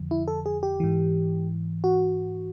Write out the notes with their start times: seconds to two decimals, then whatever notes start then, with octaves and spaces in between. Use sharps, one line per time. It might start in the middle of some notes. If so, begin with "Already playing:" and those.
Already playing: F2 D3 F3
0.11 E4
0.28 A4
0.46 G#4
0.63 G4
0.80 G#2 E3
1.84 F#4